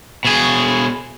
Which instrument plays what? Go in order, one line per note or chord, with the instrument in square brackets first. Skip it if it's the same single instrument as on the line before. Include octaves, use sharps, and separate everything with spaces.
[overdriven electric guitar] B2 G#4